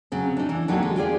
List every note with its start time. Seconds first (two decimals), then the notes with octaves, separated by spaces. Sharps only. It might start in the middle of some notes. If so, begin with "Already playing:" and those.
0.12 C#3 F#3 C4
0.37 D4 D#4
0.49 E3
0.68 D3 F#3 A#3 D#4 G4
0.83 G#3
0.96 F4 G4 G#4 D5